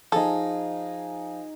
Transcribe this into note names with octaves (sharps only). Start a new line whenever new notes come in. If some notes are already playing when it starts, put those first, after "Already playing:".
F3 D#4 G#4 A4